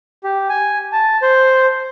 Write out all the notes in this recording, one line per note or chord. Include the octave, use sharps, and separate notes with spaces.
G4
G#5
A5
C5